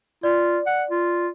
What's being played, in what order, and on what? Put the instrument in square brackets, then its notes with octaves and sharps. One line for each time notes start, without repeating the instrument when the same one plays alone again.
[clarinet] F4 [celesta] D5
[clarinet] F#5
F4